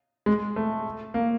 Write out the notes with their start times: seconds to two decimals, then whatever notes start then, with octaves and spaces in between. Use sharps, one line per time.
0.26 G#3
0.56 A3
1.14 A#3